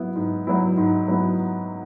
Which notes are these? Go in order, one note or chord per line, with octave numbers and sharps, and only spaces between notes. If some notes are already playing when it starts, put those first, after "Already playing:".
Already playing: F#3 B3 E4
G#2
F#3 B3 E4
G#2
F#3 B3 E4